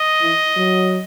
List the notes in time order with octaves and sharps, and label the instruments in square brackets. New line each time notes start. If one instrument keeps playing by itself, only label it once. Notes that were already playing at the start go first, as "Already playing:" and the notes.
Already playing: [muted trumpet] D#5
[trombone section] E3
F#3